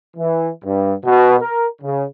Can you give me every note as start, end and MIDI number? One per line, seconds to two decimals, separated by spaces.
0.16 0.49 52
0.64 0.92 43
1.04 1.35 47
1.38 1.65 70
1.81 2.03 49